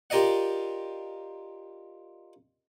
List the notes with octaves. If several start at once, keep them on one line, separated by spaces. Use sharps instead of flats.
F4 G4 A#4 D5 D#5 F#5